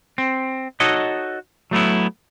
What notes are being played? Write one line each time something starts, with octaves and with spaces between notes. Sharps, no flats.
C4
D#4 F#4 A4 C#5 D#5
F#3 A3 B3 E4